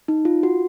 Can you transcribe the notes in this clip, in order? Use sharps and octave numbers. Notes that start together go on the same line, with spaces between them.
D#4
F4
F#4